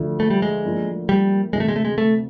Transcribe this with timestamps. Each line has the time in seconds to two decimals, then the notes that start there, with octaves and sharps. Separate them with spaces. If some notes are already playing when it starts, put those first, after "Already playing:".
Already playing: D2 D3 F3
0.20 A3
0.30 G3
0.42 G#3
0.64 A2 F3 A#3 D4
1.09 G3
1.53 D2 C3 E3 G#3
1.60 A3
1.68 G#3
1.76 A3
1.85 G#3
1.98 A3